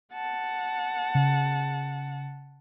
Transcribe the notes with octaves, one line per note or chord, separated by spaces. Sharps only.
F#5 A5
C#3